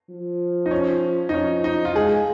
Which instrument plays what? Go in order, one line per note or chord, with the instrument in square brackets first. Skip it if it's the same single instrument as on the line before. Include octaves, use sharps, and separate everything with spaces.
[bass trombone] F3
[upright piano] D#4
C#4
D#4
[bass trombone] F3 [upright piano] C#4
[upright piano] D#4
F4
[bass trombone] G#3 [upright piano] G#4